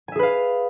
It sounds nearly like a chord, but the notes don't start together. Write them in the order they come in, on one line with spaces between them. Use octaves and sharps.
G#5 E5 G#4 B4 F5